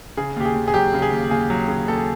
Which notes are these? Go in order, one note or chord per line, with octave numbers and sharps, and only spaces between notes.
C#3 G#4
D#2 G4
G#4
D#2
G#4
F#3 G4
C#3
G#4
D#2
D#2 G#4
F#3
C#3
D#2 A4